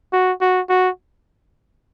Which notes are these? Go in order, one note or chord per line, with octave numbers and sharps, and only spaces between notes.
F#4
F#4
F#4